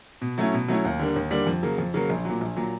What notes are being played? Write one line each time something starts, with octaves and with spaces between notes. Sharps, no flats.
B2
F#3 A3 C#4 E4
B2
F#3 A3 C#4 E4
D#2
D3 G3 A#3
D#2
D3 G3 A#3
F2
C#3 F#3 A#3
F2
C#3 F#3 A#3
A#1
A#2 F#3
A#1
A#2 F#3